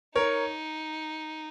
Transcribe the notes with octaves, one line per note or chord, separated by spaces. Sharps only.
D#4 A#4 C#5